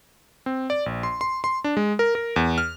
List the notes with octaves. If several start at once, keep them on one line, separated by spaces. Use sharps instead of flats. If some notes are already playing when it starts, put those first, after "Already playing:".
C4
D5
A#1
C6
C6
C6
D4
G#3
A#4
A#4
E2
F6